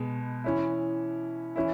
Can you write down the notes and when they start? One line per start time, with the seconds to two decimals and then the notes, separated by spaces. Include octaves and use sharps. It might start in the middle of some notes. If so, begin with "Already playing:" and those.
Already playing: B2 G#3 B3
0.44 E3 C#4 E4
1.56 E3 C#4 E4